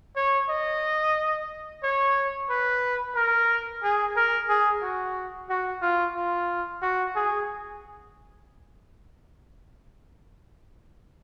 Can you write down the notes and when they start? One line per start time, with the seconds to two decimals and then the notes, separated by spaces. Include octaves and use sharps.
0.16 C#5
0.50 D#5
1.83 C#5
2.50 B4
3.15 A#4
3.83 G#4
4.16 A#4
4.49 G#4
4.82 F#4
5.49 F#4
5.82 F4
6.15 F4
6.82 F#4
7.16 G#4